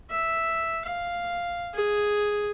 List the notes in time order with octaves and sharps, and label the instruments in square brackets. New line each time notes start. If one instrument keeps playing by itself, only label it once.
[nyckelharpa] E5
F5
G#4